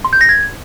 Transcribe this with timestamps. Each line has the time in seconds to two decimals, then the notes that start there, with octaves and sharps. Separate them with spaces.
0.05 C6
0.13 G6
0.21 A#6
0.29 G#6